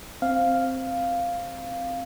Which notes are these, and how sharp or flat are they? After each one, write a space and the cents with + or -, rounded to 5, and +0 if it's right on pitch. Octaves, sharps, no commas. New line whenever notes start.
C4 +0 F5 +0